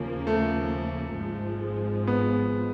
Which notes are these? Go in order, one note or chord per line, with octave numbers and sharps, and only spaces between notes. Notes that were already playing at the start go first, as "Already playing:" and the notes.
Already playing: D#2 C#3 F3 A#3
A3
G#1 G#2 F3 G#3
B3